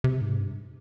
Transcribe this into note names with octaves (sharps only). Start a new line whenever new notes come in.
C3
G#2
G2